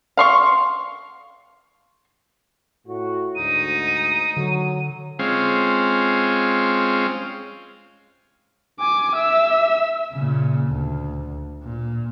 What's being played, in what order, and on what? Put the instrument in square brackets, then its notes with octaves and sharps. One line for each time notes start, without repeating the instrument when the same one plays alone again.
[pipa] F5 C6 C#6
[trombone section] A2 F#4
[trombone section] D2 G#2 [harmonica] D#4 [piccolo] D#7
[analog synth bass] D3 [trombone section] F#3
[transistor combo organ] G#3 C4 C#4 F4
[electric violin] G#5 D6
E5 E6
[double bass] A#2 C#3
D2
A#2